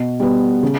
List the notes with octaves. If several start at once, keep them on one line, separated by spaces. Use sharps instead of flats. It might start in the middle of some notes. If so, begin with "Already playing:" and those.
Already playing: B2
G3 B3
C#3